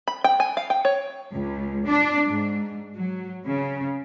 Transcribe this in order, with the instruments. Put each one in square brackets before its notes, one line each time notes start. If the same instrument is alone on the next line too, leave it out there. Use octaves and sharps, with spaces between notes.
[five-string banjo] B5
G5
G#5
F5
G5
C#5
[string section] C#2
D4
G#2
F#3
C#3